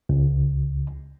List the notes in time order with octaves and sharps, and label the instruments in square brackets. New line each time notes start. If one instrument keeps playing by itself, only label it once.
[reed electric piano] C#2